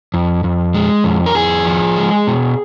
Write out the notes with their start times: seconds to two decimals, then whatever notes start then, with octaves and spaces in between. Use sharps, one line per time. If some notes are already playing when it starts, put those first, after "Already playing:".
0.14 F2
0.44 F2
0.74 G#3
1.04 F2
1.26 A#4
1.35 F2 G#4
1.65 F3
1.97 G#3
2.27 B2